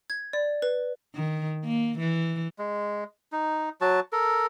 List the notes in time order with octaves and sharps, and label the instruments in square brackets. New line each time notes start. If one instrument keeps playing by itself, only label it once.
[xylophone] G#6
D5
B4
[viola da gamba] D#3
A#3
E3
[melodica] G#3
D#4
F#3 F#4 A5
A4 A#4